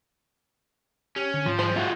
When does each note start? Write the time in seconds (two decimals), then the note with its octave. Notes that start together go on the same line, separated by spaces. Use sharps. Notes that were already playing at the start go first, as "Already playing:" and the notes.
1.16 C#4 G4
1.34 D3
1.47 G#2 F3
1.59 G3 G#3 C5
1.76 A3 F4 F#4